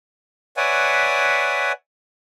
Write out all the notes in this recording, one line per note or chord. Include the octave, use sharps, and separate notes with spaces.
B4 C#5 D5 E5 F#5 G#5